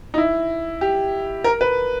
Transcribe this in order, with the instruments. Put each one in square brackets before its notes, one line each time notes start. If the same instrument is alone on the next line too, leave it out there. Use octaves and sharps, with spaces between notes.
[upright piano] D#4
E4
G4
A#4
B4